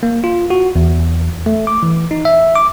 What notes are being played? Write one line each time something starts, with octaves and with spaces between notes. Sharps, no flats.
A#3
F4
F#4
E2
A3
D6
E3
D#4
E5
D6